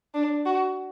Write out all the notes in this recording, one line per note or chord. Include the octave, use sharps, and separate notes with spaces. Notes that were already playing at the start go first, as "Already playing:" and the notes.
D4
F#4